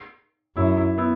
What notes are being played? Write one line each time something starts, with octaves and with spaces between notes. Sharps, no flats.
F#2 E4
E4
B3 E4